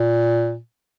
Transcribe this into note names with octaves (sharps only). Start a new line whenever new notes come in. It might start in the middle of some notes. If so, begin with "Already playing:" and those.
Already playing: A#2